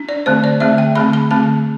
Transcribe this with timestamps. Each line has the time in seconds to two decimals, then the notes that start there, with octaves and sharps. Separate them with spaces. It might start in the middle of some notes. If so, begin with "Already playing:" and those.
Already playing: D4
0.09 D5
0.26 D3 A3 C4 C5
0.44 D5
0.60 D3 A3 C4 E5
0.78 G5
0.95 D3 A3 C4 B5
1.13 B5
1.31 D3 A3 C4 A5